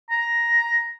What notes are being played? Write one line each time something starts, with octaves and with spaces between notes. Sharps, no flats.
A#5